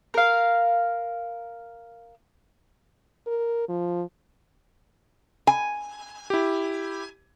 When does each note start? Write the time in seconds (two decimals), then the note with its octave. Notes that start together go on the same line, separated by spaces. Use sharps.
0.14 A#4 F5
3.27 A#4
3.68 F3
5.47 G#5
6.30 E4 G4